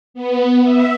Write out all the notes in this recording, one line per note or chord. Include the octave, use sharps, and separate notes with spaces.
B3
E5